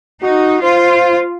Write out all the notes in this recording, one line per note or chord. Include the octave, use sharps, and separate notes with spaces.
D#4 F#4
F4 C5